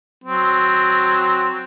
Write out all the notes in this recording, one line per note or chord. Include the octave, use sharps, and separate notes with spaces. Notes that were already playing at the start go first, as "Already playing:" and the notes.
F#3 C4